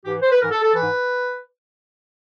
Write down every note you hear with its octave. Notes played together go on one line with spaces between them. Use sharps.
G#2 E3 G4
C5
B4
G#2 E3 A#4
A4
A4
G#2 E3 B4